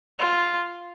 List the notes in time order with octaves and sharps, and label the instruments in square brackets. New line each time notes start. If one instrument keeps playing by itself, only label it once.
[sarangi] F4